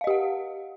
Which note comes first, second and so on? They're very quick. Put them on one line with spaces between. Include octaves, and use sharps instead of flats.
F5 D#5 G4 F#5